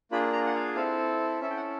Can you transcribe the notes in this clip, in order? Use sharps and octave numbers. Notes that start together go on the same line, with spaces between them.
A#3 D4 F4 G#4 B5
A#5
F#5
F5
C4 E4 A4
C#4 E4 A4 E5
G5
F#5